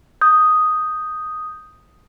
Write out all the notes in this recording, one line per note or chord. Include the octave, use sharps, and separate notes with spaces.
D#6 G6